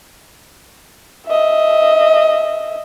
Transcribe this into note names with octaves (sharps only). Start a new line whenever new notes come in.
D#5 E5